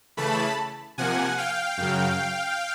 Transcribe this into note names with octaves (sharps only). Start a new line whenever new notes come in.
C#3 E3 A3 A5 B5
C3 F3 A#3 F#5 G#5
F5 G5
F#2 C#3 F#3